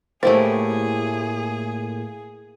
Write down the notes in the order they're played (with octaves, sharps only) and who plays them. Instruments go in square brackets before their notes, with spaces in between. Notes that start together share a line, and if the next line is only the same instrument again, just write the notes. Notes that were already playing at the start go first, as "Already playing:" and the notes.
[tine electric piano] A2 A#3 [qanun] A3 E4 G4 [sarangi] G#4 [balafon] C5